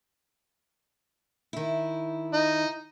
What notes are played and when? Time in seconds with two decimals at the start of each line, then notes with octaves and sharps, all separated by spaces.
1.53 D#3 E4
2.33 D#4